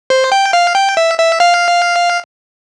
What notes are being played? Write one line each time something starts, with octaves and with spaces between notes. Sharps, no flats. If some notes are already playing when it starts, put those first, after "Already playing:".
C5
G5
F5
G5
E5
E5
F5